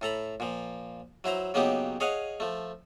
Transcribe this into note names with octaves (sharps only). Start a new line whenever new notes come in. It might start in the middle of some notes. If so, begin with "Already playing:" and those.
A2 A4 A#5 B5
A#2 F3
F#3 E4 C5 A#5
C#3 F#3 A#3 B3 D#4 G4
G#4 C#5 D#5 F5 F#5
F3 A3